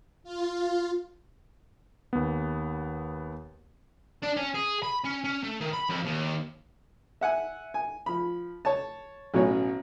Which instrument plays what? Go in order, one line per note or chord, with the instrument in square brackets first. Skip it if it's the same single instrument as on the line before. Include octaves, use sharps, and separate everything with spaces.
[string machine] F4
[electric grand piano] D#2 B3
[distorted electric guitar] D4
C#4
G#4
B5
C#4
C#4
A3
D#3
B5
F2
D#2
[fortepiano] E5 F#5 G#5
G#5
F3 B5
C#5 A5
A1 B2 F#3 C#4 C#5